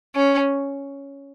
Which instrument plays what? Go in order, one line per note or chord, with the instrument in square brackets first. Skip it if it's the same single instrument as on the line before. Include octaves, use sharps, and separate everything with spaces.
[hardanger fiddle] C#4